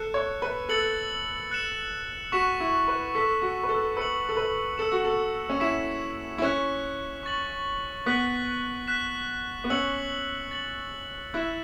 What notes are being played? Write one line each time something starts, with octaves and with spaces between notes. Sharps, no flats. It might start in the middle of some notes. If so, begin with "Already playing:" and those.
Already playing: A4 F#6 C#7 E7
C#5
B4
A4 E6 A6 C#7 F#7
F#6 C#7 E7
F#4 C#6 E6 B6 E7
E4
B4
A4 E6 B6 E7
F#4
B4
A4
B4 E6 C#7 F#7
A4
B4
A4 E6 C#7 E7
F#4
A4
C#4
E4 E6 B6 E7
E4
C#4 F#6 B6 E7
C#6 A6 F#7
B3 F#6 B6 F#7
F#6 B6 E7
B3
C#4 E6 C#7 F#7
A6 F#7
E4 F#6 B6 E7